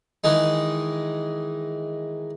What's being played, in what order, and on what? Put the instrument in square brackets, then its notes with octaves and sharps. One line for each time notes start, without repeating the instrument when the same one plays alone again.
[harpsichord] D#3 E3 G#3 D#4